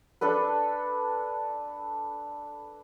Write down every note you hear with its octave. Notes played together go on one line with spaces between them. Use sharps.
D4 A4 B4